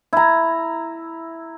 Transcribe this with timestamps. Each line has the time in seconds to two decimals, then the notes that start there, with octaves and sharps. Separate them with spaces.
0.13 E4 A#5